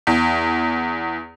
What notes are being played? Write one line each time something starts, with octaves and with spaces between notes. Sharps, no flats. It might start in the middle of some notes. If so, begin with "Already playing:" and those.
E2